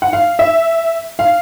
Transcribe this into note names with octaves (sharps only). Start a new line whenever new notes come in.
F#5
F5
E5
F5